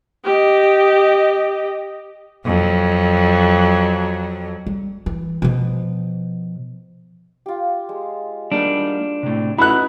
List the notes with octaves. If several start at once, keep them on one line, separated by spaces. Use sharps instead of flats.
G4 D#5
F2 F#3
G3
E3
B2 F3
F4 G4
G#3
G3 A#3 D4 D#4
A2 C3
C#4 D#4 E4 F#4 B4 B5 F#6